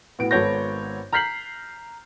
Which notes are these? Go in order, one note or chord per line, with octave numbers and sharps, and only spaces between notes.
A2 B3 F#4 D7
G#1 B3 A4 C#5 G6 A#6
A#5 F6 G6 B6 C7 F#7